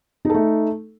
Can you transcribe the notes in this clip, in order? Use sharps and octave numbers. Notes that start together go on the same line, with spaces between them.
A3 D#4 A4